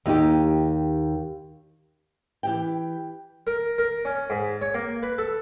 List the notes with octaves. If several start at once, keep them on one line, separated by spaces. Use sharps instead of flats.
D#2 D#4 G4
E3 G4 G5
A#4
A#4
C#4
G#2
C#5
A#3
B4
A4